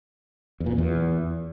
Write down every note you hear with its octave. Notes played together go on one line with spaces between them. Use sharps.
E2
A#2
F2
E2